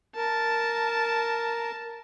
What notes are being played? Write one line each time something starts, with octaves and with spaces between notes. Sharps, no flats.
A#4 A5